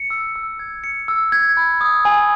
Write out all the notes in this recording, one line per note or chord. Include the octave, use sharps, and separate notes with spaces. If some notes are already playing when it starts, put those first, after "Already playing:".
Already playing: C#7
E6
E6
G#6
C#7
E6
G#6
B5
D#6
G#5